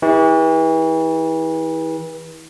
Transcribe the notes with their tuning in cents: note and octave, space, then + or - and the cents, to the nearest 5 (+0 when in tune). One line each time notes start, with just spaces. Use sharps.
E3 -35 G4 +40